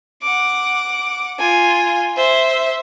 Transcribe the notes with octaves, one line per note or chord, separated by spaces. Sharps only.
F#5 D6
F4 G#5
C5 E5